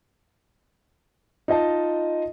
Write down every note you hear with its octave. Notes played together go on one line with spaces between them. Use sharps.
D#4 F4 D#5 A5